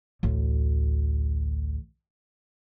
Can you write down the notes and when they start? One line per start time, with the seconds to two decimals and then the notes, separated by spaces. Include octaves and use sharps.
0.23 A1 D2